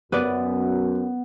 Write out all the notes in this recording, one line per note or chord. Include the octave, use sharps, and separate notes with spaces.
F#2 B3 B4 D5